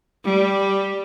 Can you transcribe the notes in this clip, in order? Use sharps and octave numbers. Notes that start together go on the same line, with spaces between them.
G3